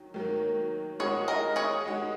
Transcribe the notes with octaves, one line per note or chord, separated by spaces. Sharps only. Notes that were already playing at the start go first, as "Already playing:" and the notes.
Already playing: D#3 F#3
D#3 F#3 A#3
G#3 D#4 F#4 G#4 C#5
A#4 D#5
G#4 C#5
G#3 D#4 F#4